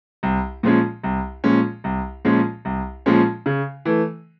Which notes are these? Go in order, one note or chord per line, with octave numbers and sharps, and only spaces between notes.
C2
A#2 F3 G#3 C#4
C2
A#2 F3 G#3 C#4
C2
A#2 F3 G#3 C#4
C2
A#2 F3 G#3 C#4
C#3
E3 A3